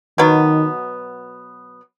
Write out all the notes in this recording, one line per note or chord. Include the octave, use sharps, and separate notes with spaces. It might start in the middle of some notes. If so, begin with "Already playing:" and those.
B2 D#3 F#3 B3